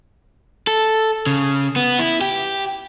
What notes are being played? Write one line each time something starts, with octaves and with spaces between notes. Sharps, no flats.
A4
C#3
B3
E4
G4